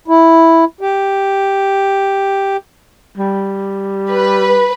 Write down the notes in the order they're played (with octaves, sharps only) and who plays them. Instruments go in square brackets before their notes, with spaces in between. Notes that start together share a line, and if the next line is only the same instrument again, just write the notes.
[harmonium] E4
G4
[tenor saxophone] G3
[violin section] B4